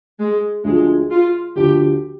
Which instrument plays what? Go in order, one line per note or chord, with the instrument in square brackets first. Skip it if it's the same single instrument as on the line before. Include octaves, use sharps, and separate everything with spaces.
[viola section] G#3
[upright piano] D2 D3 F3 [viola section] G#3
[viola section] F4
[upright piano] D2 D3 F3 [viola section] G4